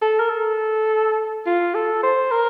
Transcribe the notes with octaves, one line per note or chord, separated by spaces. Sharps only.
A4
A#4
A4
F4
A4
C5
A#4